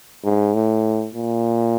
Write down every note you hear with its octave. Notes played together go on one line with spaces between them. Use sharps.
G#2
A2
A#2